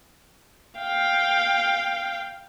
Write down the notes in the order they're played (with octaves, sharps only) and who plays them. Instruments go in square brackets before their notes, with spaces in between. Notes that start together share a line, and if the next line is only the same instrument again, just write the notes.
[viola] F5 G5